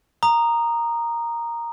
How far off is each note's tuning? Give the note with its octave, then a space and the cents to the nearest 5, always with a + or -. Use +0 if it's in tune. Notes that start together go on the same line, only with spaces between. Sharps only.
A#5 +0 D#6 -20